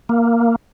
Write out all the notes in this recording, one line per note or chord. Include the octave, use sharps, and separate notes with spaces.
A#3